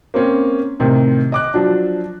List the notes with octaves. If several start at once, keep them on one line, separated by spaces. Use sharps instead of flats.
A#3 C4 C#4
A2 C3 D#3
D#5 D6 F#6
F3 F#3 D4